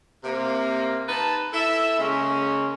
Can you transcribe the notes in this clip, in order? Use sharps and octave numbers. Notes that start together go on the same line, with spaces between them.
C3 A#3
D#4 B4 A5
E4 A4 E5
C#3 G#3 A#3 C#4